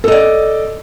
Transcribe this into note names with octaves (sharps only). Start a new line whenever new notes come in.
A4 D5 D#5